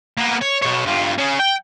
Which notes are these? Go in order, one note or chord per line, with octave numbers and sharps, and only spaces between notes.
A#3 B3
C#5
B2 C#5
G2 F4
C#4 G#4
G5